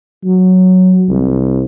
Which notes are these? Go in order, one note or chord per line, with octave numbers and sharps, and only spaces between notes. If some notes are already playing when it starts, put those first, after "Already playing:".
F#3
C2